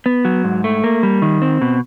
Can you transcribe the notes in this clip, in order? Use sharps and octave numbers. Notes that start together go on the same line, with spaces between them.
B3
F#3
G#2
A3
A#3
G3
D#3
C4
B2